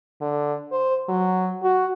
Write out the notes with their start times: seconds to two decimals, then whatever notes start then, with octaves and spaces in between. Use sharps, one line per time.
0.21 D3
0.72 C5
1.08 F#3
1.63 F#4